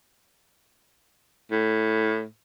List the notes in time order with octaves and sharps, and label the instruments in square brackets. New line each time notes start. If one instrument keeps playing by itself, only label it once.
[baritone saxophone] A2